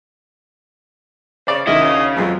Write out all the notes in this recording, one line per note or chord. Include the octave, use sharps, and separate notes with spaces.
C#3 C5 D5
D2 D#3 G#3 C#4 E4 D#5
C#3
F2 F3 F#3 G#3